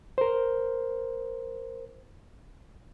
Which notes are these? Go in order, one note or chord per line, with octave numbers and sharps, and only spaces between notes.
A#4 C5